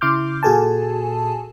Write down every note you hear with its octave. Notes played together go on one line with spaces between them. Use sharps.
C#3 E4 C6 D6 F6 G6
A#2 F#4 G#4 A4 G#5 A5